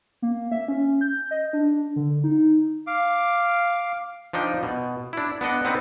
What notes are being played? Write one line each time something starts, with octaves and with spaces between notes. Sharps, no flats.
A#3
E5
C#4
G6
D#5
D4
D3
D#4
F5 D6
F3 D4 D#4 G5
B2
D4 E4
B3 D4 D#5 F#5
B3 C4 D#4 B4